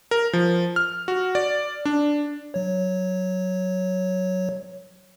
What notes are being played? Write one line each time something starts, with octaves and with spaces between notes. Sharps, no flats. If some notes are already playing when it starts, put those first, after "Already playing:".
A#4
F3
F6
F#4
D5
D4
F#3 C#5